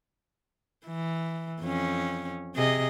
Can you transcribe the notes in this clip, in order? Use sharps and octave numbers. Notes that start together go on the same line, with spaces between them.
E3
F2 C#4
C3 G#4 D#5